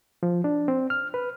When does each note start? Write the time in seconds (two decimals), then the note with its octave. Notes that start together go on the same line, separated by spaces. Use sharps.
0.23 F3
0.44 D4
0.68 C4
0.90 F6
1.14 B4